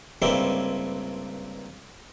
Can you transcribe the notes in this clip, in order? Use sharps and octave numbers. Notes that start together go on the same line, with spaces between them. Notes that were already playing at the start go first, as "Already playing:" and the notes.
C#2 G2 A#3 C4 D4 E4